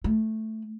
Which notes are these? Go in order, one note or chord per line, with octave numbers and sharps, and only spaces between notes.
A3